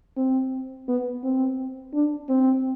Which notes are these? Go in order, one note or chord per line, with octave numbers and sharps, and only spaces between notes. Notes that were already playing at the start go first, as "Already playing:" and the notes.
C4
B3
C4
D4
C4